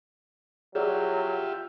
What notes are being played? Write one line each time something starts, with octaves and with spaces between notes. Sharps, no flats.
F#3 F4 G4 G#4 C#5 D5 E5